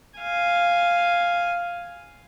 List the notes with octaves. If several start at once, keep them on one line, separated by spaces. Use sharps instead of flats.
F5 G#5